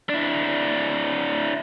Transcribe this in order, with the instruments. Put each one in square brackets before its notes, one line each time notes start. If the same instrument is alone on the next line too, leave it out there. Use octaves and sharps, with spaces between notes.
[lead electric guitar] D4 E4